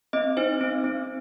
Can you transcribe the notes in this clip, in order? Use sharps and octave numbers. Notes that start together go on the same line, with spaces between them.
C4 D#5
D#4 C5
C4
C4